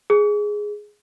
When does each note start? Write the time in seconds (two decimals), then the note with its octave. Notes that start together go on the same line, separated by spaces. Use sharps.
0.10 G#4